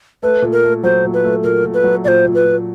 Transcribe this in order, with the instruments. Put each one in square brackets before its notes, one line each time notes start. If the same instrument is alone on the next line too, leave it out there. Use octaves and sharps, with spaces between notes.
[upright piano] A3 [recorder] B4
[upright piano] A#2
[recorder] A#4
[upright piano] A3
[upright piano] F#3 [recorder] C5
[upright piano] A#2
[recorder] B4
[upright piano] A3
[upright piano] A#2 [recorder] A#4
[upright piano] A#2
[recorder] B4
[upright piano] F#3
[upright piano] A#2 [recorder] C5 D5
[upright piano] A#2
[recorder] B4
[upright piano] A#2